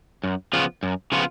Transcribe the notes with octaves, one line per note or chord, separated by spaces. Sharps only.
F#2
C#3 F3 B3 F4
F#2
C#3 F3 B3 F4